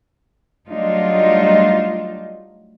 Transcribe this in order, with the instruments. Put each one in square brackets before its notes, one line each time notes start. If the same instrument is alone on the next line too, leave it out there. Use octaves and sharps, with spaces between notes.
[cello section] F#3 G3 A3 D4 D#4 F4